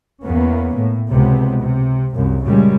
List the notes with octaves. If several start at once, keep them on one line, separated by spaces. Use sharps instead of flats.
E2 A#3 B3 C#4
A2
C#2 C3 G#3 B3
C3
C2 F#2
F#2 A#2 C#3 G3 G#3